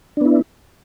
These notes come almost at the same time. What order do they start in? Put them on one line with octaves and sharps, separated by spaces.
D4 B3 E4